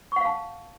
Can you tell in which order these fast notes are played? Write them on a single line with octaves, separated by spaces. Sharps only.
C#6 F#5 F5 A5